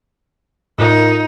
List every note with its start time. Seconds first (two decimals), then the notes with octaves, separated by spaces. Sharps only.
0.79 A2 D#4 F4 A#4